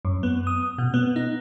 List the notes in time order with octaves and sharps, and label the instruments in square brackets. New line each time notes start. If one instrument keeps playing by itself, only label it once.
[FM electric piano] F#2
B3
D#6
B2
B3
D#4